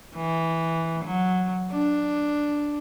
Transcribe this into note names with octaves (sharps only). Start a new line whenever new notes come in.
E3
F#3
D4